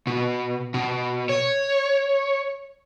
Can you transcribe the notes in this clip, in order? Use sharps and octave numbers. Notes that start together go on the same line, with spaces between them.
B2
B2
C#5